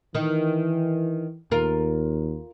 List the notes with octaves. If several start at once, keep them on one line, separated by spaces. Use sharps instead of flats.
D#3 E3
D#2 F4 A#4